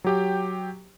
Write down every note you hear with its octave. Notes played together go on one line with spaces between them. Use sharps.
F#3 G4 G5